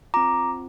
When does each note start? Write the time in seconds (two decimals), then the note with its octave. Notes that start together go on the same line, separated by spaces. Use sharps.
0.14 C4 F4 A#5 D6